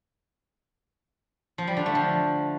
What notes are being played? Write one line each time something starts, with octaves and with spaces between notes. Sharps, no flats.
F3
G3
D3
A3
F3